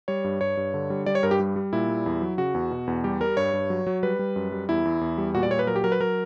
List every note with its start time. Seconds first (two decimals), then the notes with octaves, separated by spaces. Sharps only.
0.08 G3 C#5
0.24 G2
0.41 G2 C#5
0.57 G2
0.74 D3
0.90 G3
1.06 G3 D5
1.15 C#5
1.23 G2 A#4
1.31 G4
1.40 G3
1.56 G3
1.73 A#2 E4
1.89 G3
2.06 E2
2.22 F#3
2.38 C#3 F#4
2.54 E2
2.71 B2
2.87 E2
3.04 G3 G4
3.21 G3 A#4
3.37 G2 C#5
3.53 G2
3.70 F#3
3.87 F#3
4.03 G3 B4
4.19 G3
4.36 F#2
4.52 G3
4.69 E2 E4
4.85 E2
5.01 E2
5.18 G3
5.34 A#2 F#4
5.43 D5
5.51 A#2 C#5
5.59 B4
5.67 F#3 A#4
5.76 G4
5.84 F#3 A#4
5.92 B4
6.00 F#3 A#4